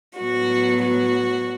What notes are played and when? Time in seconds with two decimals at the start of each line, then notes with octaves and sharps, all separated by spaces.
0.18 A2 F#3 B3 F#4
0.83 F#4